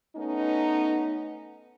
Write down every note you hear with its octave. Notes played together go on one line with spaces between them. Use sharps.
A3 B3 C#4 D#4